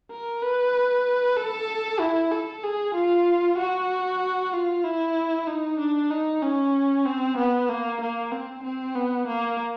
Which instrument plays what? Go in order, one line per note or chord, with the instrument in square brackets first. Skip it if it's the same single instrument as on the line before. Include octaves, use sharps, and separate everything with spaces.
[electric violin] A#4
B4
A4
E4
A4
G#4
F4
F#4
F4
E4
D#4
D4
D#4
C#4
C4
B3
A#3
A#3
C4
C4
B3
A#3